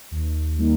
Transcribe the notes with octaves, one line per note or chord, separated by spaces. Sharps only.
D#2
D#3 G3 A#3 D#4